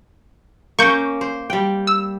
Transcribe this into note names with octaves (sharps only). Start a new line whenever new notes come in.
A#3 C#4 C#6 G6
C5
G3 G5
E6